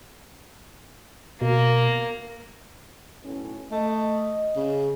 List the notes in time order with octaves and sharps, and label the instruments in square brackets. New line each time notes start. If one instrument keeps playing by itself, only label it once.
[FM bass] B2 [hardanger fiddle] A#3
[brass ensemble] B1 A2 C#4
[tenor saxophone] A3 [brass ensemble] D#5
[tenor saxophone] C#3